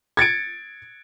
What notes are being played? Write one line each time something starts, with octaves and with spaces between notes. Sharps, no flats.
G#6 A6 C#7 D7